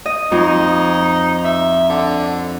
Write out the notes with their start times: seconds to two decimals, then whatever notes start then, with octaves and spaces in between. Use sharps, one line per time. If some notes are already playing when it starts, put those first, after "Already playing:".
0.06 D#5
0.32 F2 D#4
1.45 E5
1.90 D3